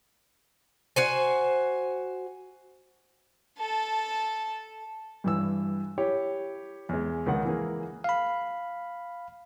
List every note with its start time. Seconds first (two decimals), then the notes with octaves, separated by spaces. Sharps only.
0.96 F#4 C5 G#5
3.58 A4 A5
5.24 G2 E3 E6
5.98 E4 G4 C#5
6.89 E2 G#3
7.26 C#2 D#3 F#5
7.45 E3 A#3 G#4
8.04 F5 B5